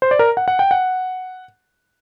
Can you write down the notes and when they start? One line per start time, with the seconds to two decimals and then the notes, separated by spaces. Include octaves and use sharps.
0.02 C5
0.11 D5
0.19 A#4
0.37 F#5
0.48 F#5
0.59 G5
0.71 F#5